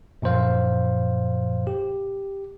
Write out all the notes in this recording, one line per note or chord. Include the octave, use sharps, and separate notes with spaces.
F#2 A#2 F3 C5 F5
G4